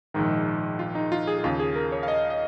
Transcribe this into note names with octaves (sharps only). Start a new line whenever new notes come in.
A#1 G#2 D#3 D#4
F4
D#4
F4
G#4
G#4
D#2 C#3 F4
G#4
A#4
C#5
F5
D#5
D#5